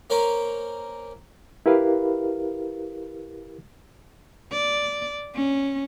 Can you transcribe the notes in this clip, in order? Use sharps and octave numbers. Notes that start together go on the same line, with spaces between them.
A#3 C#4 A#4 C5
E4 G4 A#4 B4 F5
D5
C#4